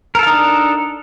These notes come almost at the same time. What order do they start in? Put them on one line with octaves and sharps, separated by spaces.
A#4 A4 F5 D#4 D4